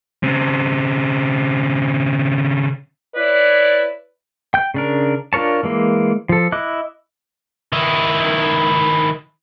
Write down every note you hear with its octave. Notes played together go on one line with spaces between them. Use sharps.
C#3 C4
E4 B4 C#5 D5
G5 G6
C#3 D4 A#4
D4 F4 A#4 C#5 A5
E3 G#3 A#3
F3 A4
E4 D#5 D6 F#6
D#3 E4